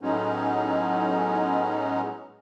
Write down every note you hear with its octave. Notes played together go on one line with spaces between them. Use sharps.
A2 F#3 G#3 B3 C#4 D#4